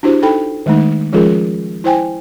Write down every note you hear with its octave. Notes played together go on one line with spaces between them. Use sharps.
D4 E4 F#4 G4 C5
D#4 A4 G5 B5
D#3 G#3 A3 D#4
F3 G#3 C#4 F4 G#4 A#4
E4 C5 G5 G#5